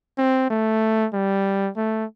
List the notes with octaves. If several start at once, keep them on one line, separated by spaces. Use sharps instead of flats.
C4
A3
G3
A3